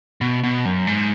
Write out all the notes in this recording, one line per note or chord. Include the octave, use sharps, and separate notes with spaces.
B2
B2
F#2
G#2